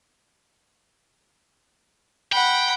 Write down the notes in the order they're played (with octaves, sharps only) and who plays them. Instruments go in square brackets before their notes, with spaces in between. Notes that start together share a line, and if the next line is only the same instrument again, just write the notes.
[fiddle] F#5 B5 [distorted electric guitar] G5